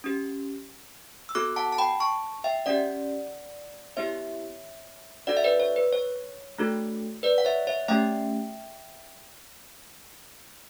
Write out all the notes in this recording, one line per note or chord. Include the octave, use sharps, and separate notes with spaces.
C#4 G4
E6
B3 F#4 A4 D6 F#6
F#5 A5
A5
G5 B5
A5 C#6
E5 G5
C#4 G4 D5 F#5
B3 E4 G4 C#5 E5
D4 F#4 A4 D5 F#5
E5
B4 D5
C#5
B4
C#5
A3 D4 F#4 A4
B4 D5
F#5
C#5 E5
C#5 E5
A3 C#4 G4 E5 G5